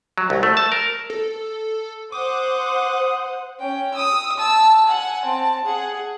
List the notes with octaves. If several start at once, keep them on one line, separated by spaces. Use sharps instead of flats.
F#3
C2
A3
A5
A#4
A4
C5 F#5 D6 D#6
C#4 G5
D#6 E6
A5 E6
F#5 G#5
C4 A5
G#4 F#5